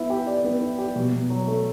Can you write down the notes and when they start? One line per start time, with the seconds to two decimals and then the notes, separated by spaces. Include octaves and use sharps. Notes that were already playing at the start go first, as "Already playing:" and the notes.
Already playing: B3 E4
0.10 G4
0.27 D5
0.44 B3
0.61 E4
0.78 G4
0.96 B2
1.13 B2
1.30 F#3
1.47 A3